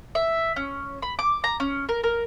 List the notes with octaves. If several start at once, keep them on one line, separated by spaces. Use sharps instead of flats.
E5
C#4
B5
D6
A#5
C#4
A#4
A#4